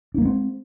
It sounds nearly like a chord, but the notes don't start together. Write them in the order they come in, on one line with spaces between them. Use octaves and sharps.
D4 A#3 G#3 C4